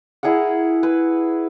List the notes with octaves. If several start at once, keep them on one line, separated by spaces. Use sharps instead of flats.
E4 G#4 A#4 F#5
B4